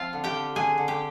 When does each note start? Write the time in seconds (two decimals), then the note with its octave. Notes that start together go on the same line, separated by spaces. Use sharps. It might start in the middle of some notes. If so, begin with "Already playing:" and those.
Already playing: F3 C4 F4 F5
0.13 D3
0.24 G4 G5
0.35 D3
0.55 D3 G#4 G#5
0.78 D3
0.88 G4 G5